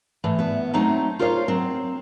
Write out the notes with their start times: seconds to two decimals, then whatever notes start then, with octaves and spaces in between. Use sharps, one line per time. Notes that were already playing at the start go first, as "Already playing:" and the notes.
0.24 A2 E3
0.39 B3 E5
0.73 F#3 A3 C4 D#4
1.19 F4 A#4 C5 C#5 D#5 F5
1.48 F#3 C4